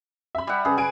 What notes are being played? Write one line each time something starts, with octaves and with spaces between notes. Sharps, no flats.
E5 B5
G3 F#5
C#3 G#4 B4
G#5 D7